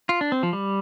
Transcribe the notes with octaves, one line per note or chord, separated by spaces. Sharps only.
F4
D4
C4
F3
G3